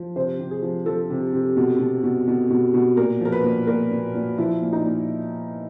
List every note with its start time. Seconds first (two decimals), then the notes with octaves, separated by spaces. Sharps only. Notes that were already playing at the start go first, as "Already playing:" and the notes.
Already playing: F3
0.16 C3 C5
0.39 C3
0.51 G#4
0.62 F3
0.86 F3 A4
1.10 C3
1.33 C3
1.57 B2
1.79 B2
2.04 B2
2.27 B2
2.50 B2
2.74 B2
2.97 A#2 A#4
3.20 F3 A#4
3.32 B4
3.44 A#2
3.67 A#2 A#4
3.91 A#2
4.15 A#2
4.38 F3 E4
4.62 A#2
4.73 D#4
4.84 A#2